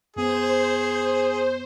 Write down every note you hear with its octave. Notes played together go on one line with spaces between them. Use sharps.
F#2 B3 G#4 C5